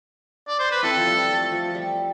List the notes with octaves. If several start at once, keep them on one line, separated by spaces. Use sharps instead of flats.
D5
C5
B4
C4 E4 A4
F3
G3
A3
F3
G3